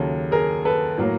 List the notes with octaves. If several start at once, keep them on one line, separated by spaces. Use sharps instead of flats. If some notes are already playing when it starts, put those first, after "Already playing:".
Already playing: D#2 C#3 F#3 A4
G#4 A#4
A4 B4
A2 F#3 A#3